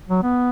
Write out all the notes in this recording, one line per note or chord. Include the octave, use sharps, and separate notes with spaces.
F#3
B3